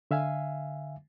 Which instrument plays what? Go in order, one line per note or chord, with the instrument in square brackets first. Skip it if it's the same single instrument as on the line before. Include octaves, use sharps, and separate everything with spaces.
[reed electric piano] D3 E5 F5 G#5